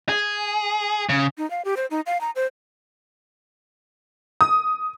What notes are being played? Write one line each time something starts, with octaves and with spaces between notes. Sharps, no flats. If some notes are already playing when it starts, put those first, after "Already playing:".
G#4
C#3
D#4
F5
G4
C5
D#4
F5
A#5
C5
D#6